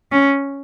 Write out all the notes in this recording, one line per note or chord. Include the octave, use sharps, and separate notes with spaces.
C#4